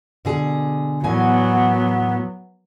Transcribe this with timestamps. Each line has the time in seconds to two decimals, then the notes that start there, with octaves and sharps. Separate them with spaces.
0.25 B2 D3 G#4
1.04 E2 A2 F#3 B3 G#5